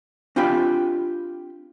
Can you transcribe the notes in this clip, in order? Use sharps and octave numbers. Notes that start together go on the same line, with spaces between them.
C4 D4 F4 G4 G5 B5